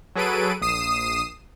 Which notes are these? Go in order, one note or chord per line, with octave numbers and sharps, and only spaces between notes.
F#3 G#4 A4 B4 D7 D#7
A#1 D#6 C7 D#7 E7